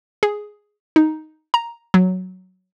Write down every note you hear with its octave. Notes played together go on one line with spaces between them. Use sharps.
G#4
D#4
A#5
F#3